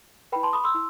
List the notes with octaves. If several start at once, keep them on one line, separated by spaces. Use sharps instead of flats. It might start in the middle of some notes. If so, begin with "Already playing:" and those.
E4 B4 G5 B5
A5 C6
B5 D#6
C6 E6
E4